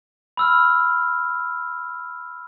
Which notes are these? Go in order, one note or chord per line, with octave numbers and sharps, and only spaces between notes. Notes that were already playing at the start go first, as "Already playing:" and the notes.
B5 E6 F6